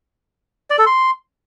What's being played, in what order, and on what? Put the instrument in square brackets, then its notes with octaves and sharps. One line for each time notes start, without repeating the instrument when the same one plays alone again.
[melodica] D5
A4
C6